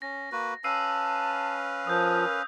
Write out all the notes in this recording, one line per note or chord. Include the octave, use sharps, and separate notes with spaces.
C#4 A#6
A#3 F#4 B4
C#4 B4 F5 A5 E6 C7 D#7
F3 A#4 D#6 G6